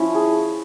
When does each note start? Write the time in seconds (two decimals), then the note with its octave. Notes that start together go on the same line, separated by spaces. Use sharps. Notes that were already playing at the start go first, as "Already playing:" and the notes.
Already playing: F3 C#4 E4
0.14 G#4